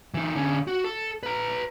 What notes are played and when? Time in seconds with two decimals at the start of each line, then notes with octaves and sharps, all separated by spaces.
0.14 E3 D#4
0.35 D3 C#4
0.68 F#4
0.84 A4
1.23 B4 A#5